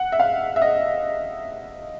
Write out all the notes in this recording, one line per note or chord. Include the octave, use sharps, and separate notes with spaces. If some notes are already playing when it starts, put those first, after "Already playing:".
Already playing: F#5
E5
F5
E5
D#5